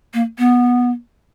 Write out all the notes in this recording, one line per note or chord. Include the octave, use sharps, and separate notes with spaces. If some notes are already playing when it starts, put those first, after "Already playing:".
A#3
B3